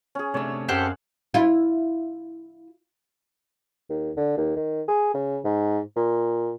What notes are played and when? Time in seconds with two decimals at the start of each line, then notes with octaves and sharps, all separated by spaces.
0.15 C#4 G#4
0.34 C3 A3 D4 C#5 E6
0.68 F#2 C4 G4 A4 C5 F5 F#5
1.34 E4 F4
3.89 D#2
4.17 D3
4.37 D#2
4.56 D#3
4.88 G#4
5.14 C#3
5.44 G#2
5.96 A#2